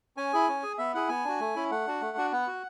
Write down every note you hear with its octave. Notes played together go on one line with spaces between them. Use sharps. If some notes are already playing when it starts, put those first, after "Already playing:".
C#4 G#5
E4 G#4
C#4
G#4
B3 E5
E4 G#4 F#5
B3 G#5
D4 F#4
A3
C#4 E4
A3 F#5
D4 F#4
A3
D4 F#4
B3 F#5
F#4